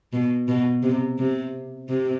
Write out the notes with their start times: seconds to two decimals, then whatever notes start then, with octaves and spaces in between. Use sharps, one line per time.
0.13 B2
0.48 B2
0.83 C3
1.18 C3
1.89 C3